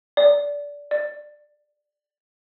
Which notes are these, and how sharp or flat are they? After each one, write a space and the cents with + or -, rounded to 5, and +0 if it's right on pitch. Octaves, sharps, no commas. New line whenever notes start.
D5 -20
D5 +15